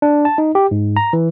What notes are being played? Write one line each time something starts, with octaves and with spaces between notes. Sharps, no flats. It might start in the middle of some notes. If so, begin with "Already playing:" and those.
D4
A5
D#4
G4
G#2
A#5
E3